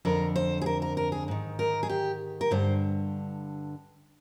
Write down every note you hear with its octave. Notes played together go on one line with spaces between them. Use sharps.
F2 D3 A#4
C5
G#4
A#4
A#4
A#4
G#4
G#2 D#3
A#4
G#4
G4
A#4
G2 D3 C5